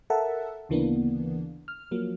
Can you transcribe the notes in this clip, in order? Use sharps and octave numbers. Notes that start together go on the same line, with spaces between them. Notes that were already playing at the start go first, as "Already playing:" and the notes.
A4 A#4 E5 F#5 A5
D2 C#3 E3 A#3 B3 D4
F6
F3 F#3 A#3